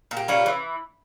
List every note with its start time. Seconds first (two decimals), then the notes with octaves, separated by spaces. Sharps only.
0.11 A#2
0.17 G4
0.28 G3 C#4 F4
0.46 E3